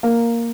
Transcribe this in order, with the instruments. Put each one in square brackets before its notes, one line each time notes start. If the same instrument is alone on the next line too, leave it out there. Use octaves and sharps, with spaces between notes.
[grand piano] A#3